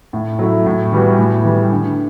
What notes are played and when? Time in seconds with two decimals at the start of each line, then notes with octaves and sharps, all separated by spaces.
0.13 A2
0.39 F#3 A3 E4
0.66 A2
0.92 E3 G3 B3 F#4
1.18 A2
1.45 E3 G3
1.72 D3